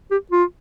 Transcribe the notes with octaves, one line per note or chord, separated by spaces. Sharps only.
G4
F4